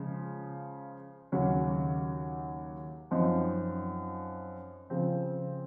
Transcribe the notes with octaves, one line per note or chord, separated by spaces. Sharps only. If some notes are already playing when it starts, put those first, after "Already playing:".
Already playing: C#3 F3 G#3
D#2 C#3 F#3 C#4
F#2 F3 C4 D#4
C#3 F3 C4